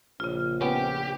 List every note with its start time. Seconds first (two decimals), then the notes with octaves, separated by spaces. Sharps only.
0.20 A#1 C#3 F4
0.61 B3 C#4 G4